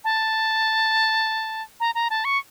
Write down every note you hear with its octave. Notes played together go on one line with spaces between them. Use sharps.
A5
A#5
A#5
A5
C#6